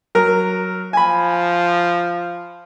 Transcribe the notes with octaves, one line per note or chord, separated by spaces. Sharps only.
F#3 A#4
F3 G#5 B5